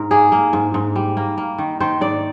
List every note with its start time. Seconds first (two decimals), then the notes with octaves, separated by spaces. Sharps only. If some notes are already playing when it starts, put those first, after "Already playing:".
Already playing: G#2 A#4
0.11 A#3 G#4
0.32 A#3
0.53 G#2
0.74 G#2
0.96 G3
1.17 A#3
1.38 A#3
1.58 D#3
1.80 D#3 C5
2.01 G#2 D5